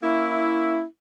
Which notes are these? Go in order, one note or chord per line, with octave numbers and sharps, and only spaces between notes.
A#3 C#4 E4